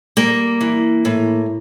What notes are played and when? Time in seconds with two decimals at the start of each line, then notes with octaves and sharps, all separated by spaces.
0.17 G3 A#3
0.61 E3
1.05 A2